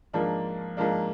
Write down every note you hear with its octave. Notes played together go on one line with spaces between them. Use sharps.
G#2 F3 A#3 D4
G#2 F3 A#3 D4